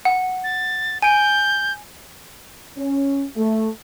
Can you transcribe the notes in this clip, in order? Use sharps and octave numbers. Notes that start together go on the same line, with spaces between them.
F#5
A6
G#5 G6 D7
C#4
A3